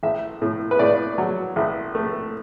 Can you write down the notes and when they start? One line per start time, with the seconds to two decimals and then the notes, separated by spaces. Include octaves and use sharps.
0.03 A1 E5
0.42 A2
0.71 B4
0.79 A2 D5
1.18 F#3
1.56 A1
1.95 A3